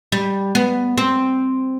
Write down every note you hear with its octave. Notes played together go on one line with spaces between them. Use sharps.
G3
B3
C4